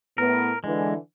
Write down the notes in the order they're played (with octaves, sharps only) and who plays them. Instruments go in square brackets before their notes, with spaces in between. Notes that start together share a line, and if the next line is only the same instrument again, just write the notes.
[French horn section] A2 B3 [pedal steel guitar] A#4
[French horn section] D3 E3 [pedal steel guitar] G#3